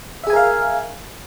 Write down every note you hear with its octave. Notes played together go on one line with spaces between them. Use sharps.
G#4 A#4 E5 F5 G#5